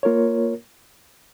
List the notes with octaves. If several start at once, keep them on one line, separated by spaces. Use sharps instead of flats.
A#3 F4 A#4 C#5